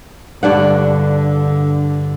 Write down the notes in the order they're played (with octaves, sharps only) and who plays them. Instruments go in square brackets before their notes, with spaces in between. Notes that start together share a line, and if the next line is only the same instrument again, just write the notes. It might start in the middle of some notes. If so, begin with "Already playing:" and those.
[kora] G2 D4 F#5 [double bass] D3